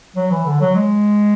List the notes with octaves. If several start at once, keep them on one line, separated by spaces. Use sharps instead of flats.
F#3
E3
D3
F#3
G#3